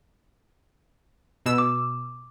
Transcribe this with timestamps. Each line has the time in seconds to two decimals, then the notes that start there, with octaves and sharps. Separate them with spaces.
1.46 B2 E6
1.58 D6